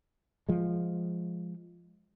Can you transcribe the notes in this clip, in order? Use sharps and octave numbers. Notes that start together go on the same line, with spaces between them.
F3 G#3